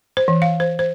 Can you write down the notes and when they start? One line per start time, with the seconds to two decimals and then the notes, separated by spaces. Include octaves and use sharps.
0.17 C5
0.28 E3
0.42 F5
0.60 C5
0.79 C5